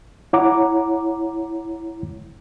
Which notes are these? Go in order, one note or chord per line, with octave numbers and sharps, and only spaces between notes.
E4 C#5 F#5 A#5 D6